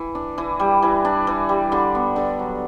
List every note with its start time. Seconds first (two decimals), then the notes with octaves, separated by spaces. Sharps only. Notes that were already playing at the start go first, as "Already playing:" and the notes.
Already playing: E3
0.15 D4
0.38 E3
0.60 G3
0.82 E3
1.05 D4
1.27 E3
1.49 G3
1.72 D3
1.95 B3
2.16 D3
2.39 F#3